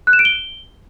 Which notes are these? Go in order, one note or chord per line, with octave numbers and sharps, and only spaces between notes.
F#6
E7
D7
G7